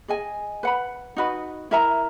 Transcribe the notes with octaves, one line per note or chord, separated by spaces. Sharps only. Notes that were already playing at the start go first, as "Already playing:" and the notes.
G#4 D#5 G#5
B4 F#5 B5
D#4 F#4 B4 D#5
E4 A#4 E5 A#5